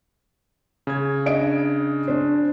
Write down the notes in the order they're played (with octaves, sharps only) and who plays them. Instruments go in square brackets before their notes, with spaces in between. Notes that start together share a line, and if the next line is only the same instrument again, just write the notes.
[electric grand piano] C#3 G#6
[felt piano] D4 D#5 D7
D4 C5